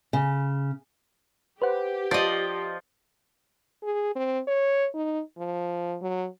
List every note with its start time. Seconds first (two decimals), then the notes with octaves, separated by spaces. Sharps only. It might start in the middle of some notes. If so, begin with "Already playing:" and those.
0.13 C#3
1.62 G4 B4 C5 F#5
2.11 F3 D5 D#5
3.83 G#4
4.16 C4
4.47 C#5
4.94 D#4
5.38 F3
6.02 F#3